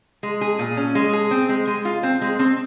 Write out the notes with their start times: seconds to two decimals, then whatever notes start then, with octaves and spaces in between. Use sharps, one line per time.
0.23 G#3
0.41 G#4
0.59 A#2
0.77 C#4
0.95 G#3
1.13 G#4
1.31 C4
1.49 G#3
1.67 G#3
1.85 F4
2.03 C4
2.22 G#3
2.39 C4